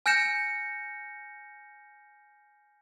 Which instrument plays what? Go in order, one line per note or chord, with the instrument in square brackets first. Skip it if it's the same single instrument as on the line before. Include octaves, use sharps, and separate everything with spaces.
[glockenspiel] G#5 F6 G6 A#6 C#7 E7